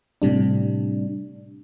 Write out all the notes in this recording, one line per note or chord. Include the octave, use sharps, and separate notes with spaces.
A2 C3 G3 D4